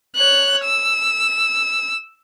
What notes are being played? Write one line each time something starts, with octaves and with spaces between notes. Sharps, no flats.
C#5 F#6
E6